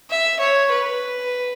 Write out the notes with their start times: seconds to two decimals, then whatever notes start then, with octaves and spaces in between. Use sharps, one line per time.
0.10 E5
0.40 C#5
0.71 B4